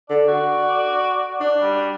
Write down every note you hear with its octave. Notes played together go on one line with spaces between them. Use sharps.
D3 D5
F#4
D4
G3